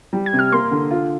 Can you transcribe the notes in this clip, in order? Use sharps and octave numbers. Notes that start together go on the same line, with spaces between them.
G3
G#6
C3
F6
A#3 C6
D3
F4